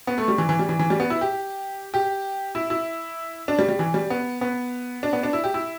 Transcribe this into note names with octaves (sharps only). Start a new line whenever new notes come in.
B3
A3
G3
E3
E3
G3
E3
E3
G3
B3
E4
G4
G4
E4
E4
D4
G3
G3
E3
G3
B3
B3
D4
B3
D4
E4
G4
E4